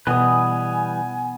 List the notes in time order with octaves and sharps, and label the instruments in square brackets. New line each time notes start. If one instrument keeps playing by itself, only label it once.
[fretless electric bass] B2 [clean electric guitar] E3 G3 B4 [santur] B3 D#6 [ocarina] G#5